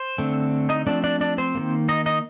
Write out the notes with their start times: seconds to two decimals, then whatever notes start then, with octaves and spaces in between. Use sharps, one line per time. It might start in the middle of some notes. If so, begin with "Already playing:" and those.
Already playing: C5
0.18 D3 A3 C4
0.69 D#4 D#5
0.87 F3 A3 C4 D4 D5
1.04 D4 D5
1.21 D4 D5
1.38 C4 C5
1.55 D#3 G3 A#3
1.89 D#4 D#5
2.06 D#4 D#5